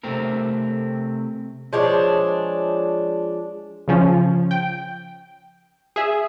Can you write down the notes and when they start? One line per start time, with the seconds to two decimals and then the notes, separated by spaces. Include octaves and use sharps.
0.03 C3 A3 C4 A#4
1.73 F3 G#3 D4 C#5
3.88 C#3 F3 C#4
4.51 G5
5.96 G#4 E5